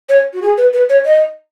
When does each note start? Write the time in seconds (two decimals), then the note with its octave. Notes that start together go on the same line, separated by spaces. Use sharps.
0.09 C#5
0.34 F#4
0.42 G#4
0.58 B4
0.73 B4
0.89 C#5
1.05 D#5